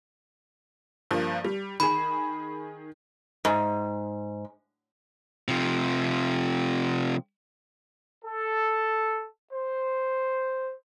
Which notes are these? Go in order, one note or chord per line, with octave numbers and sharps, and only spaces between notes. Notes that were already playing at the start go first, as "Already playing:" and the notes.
G2 F3 A#3
G3
D#3 G#4 B5
G#2
C3 F3
A4
C5